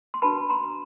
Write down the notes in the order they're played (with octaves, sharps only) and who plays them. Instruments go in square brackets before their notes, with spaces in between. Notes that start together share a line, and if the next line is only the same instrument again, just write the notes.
[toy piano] C6
D4 F#4 B4 A5 B5
A#5 C6